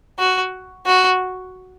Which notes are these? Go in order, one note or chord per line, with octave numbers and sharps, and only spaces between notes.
F#4
F#4